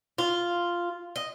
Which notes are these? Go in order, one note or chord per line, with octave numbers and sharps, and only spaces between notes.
F4
D#5